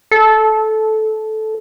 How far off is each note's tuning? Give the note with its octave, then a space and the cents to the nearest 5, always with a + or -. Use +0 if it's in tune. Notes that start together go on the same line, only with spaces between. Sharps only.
A4 -15